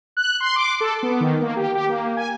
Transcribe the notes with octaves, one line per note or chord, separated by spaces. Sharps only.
F#6
C6
D6
A4
B3
D#3
A#3
G4
G4
A#3
G#5